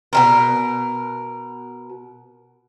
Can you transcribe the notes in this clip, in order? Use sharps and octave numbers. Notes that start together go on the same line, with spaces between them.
B2 E3 A#4